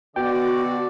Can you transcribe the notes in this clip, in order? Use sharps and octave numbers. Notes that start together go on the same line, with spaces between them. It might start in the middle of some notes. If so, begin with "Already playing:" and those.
B2 D3 F#4 D5 G5